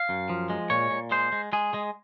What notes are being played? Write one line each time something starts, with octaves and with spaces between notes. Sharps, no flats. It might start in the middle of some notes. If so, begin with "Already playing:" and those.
Already playing: F5
F#2
F3
G#3
A#2 C#5
A#2
G#3 C5
G#3
G#3 G#4
G#3